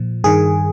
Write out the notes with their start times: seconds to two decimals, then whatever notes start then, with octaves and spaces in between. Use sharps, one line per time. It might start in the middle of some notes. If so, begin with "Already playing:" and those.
Already playing: A#2 F3
0.24 G2 D#3 G#4